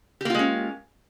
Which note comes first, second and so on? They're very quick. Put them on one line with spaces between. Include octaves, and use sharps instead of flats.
G4 A#3 F4 G#3 C#4